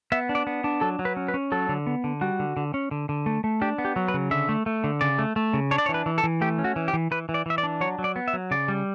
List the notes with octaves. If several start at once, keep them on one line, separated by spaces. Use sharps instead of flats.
B3 E5
D4
D5
B3
D4
F#3 A4
F#3
B4
C#4
B4
C#4
F#3 A4
D3
B3
D3
G3 F#4
D3
D3
C#4
D3
D3
A3
A3
D4 G4
B3
G4
F#3
B4
C#3
D3 E5
A3
A3
D3
C#3 D5
A3
A3
C#3
D4 C#5
D5
C#5
E3
B4
E3
A4
E3
A3 G4
C#4
F#4
E3
G4
E3
E3 B4
E3
D5
E3 E5
D5
D4
F#3 C#5
F#3
D5
B3
E5
F#3
C#3 D5
G3